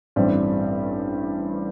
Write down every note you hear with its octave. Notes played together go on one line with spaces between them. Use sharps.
A1 G2 G3 C4